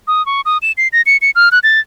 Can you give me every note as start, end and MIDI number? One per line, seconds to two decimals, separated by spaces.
0.08 0.25 87
0.26 0.41 85
0.45 0.58 87
0.62 0.72 100
0.77 0.88 96
0.93 1.02 94
1.06 1.17 97
1.22 1.31 97
1.35 1.49 89
1.52 1.59 90
1.63 1.80 93